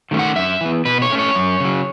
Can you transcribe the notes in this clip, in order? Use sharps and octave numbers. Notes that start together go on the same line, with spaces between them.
D#3 A3 C#4
F#5
F#2 E5
E3 B3
B2 B4
C#5
A3 C#4
C#5
F#2
C#3 F#3